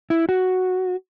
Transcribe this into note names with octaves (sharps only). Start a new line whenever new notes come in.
E4
F#4